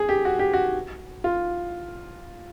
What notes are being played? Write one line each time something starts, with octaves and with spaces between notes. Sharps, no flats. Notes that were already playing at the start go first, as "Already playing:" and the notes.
Already playing: G#4
G4
F#4
G4
F#4
F4